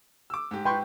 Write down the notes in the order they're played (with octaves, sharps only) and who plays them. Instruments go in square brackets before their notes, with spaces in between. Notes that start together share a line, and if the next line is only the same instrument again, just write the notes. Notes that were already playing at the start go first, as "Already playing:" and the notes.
[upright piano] D6 E6
G#2 G4
[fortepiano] B4 C6 C#6 [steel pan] G5